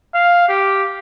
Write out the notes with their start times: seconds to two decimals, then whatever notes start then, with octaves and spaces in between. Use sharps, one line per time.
0.14 F5
0.49 G4